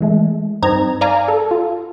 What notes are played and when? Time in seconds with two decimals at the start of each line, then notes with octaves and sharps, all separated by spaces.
0.01 E3 G#3 A3
0.62 G2 C4 D#4 A#5 G#6
1.01 D5 F5 G#5 A#5
1.28 A4
1.51 F4